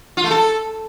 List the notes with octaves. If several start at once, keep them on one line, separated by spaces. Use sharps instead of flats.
F4
A3
A4